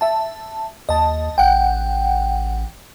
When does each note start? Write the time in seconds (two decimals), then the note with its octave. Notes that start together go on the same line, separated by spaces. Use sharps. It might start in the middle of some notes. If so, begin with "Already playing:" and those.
0.01 E5 A5
0.89 D#2 D#5 A5
1.38 A1 F#5 G5